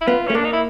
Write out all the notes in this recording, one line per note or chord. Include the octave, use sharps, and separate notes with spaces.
E4
B3 F4
A3 C#4
A#3 D4
D#4
E4